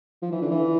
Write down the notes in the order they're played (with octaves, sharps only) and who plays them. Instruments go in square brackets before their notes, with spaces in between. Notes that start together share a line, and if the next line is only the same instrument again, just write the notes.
[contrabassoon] F3
E3
D3
E3